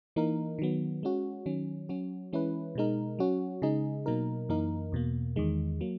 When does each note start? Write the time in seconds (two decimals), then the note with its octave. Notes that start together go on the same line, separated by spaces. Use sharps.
0.16 E3 A#3 D#4 A#4
0.59 D#3 F#3 B3
1.03 G#3 C#4 F#4
1.46 D#3 F#3 C#4
1.89 F#3 C#4 F#4
2.33 E3 G#3 C#4 E4 B4
2.75 B2 G#3 D#4 A#4
3.19 F#3 C#4 F#4
3.62 C#3 G#3 D#4 G#4
4.06 B2 F#3 A#3 D#4 A#4
4.49 F#2 E3 A#3 D#4 A#4
4.92 E2 B2 A#3
5.36 E2 D#3 G#3
5.81 F#3 A#3